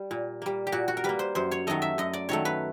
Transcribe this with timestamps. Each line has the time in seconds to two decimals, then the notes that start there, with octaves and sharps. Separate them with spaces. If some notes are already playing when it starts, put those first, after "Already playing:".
Already playing: G3 G4
0.11 A#2
0.42 G3 A#3
0.67 G4
0.72 A#2 F#4
0.88 F#4
0.97 A#4
1.04 G3 A#3 B4
1.19 C5
1.35 F#2 C5
1.51 C#5
1.67 D#3 F#3 A3 D#5
1.82 E5
1.98 F#2 D#5
2.13 D5
2.29 D#3 F#3 A3 C#5
2.45 B4